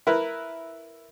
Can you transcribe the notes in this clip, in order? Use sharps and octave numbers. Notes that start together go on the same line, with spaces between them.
E4 A#4 B4